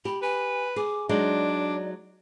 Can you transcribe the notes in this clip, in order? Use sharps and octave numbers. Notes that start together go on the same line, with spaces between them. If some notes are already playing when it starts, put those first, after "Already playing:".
G4 B5
B4 G#5
G#4 D6
F#3 G#3 D4 D#4 D5